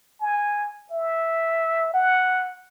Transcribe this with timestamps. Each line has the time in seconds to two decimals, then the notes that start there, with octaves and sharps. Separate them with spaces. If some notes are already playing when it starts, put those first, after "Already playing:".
0.20 G#5
0.92 E5
1.94 F#5